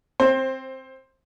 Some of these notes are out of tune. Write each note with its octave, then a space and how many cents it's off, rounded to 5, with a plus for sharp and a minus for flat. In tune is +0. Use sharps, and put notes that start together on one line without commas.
C4 +5 C5 +20